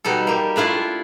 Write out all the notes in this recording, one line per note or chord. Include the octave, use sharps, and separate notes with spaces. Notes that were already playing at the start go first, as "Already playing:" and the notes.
B2 G3 D#4 A4
A#3 G4
A3 D4 E4 F4